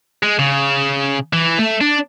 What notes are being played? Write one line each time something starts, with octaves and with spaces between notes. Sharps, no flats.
G#3
C#3
E3
A3
D4